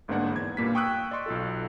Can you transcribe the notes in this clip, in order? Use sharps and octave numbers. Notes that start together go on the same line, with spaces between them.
G1 G#2 A#3 B3 D4 F#5
E2 G#6
G2 A#2 A#3 B4 B6
G5 C#6 D#6 E6 F#6
D5 D#5 C6 C#6
B1 F4 A4